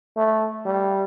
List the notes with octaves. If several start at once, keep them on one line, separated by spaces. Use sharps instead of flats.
A3
G3